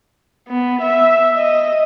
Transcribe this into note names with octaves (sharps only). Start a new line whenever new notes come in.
B3
E5
D#5